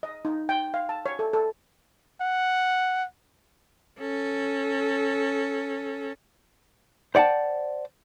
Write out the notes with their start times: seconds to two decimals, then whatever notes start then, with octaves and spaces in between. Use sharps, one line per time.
0.03 D#5
0.25 D#4
0.49 G5
0.74 F5
0.89 A5
1.06 C#5
1.19 A4
1.33 A4
2.21 F#5
4.00 C#4 A4
7.15 C5 D5 F#5 G5 A5